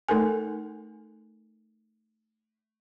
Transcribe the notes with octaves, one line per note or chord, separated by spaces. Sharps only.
A3 D#4 A4 A#4 G#5